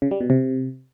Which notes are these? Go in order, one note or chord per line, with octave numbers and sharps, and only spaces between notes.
C#3
G3
B2
C3